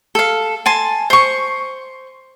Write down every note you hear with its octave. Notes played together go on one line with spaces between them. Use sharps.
A4 F5
G#5 A5 C6
C5 C#6